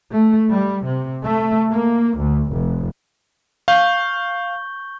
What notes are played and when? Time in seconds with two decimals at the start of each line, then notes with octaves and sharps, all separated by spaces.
0.13 A3
0.51 G3
0.84 C3
1.24 A3
1.70 A#3
2.18 D2
2.52 F1
3.68 F5 C#6 G6 G7